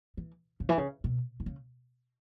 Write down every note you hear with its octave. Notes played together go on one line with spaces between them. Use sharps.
E3
C#3
E3
C#3
B2
E3
C#3